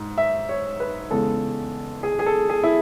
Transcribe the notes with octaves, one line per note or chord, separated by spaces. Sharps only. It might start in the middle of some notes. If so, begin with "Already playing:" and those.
Already playing: G#2
E5
C#5
B4
E2 C#3 G#3 A4
G#4
G#4
A4
G#4
E4